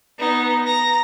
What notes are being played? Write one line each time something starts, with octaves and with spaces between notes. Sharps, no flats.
B3 D#4
A#5 A#6